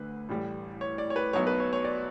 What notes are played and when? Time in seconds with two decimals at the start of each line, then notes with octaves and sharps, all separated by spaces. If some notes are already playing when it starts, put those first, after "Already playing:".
Already playing: D2 D3 B4
0.29 A1 A2 G3
0.81 C#5
0.98 D5
1.10 C#5
1.16 B4
1.33 B1 B2 F#3 B3 C#5
1.47 B4
1.60 C#5
1.73 C#5
1.84 D5